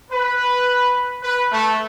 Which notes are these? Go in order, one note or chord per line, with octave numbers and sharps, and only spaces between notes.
B4
B4
A3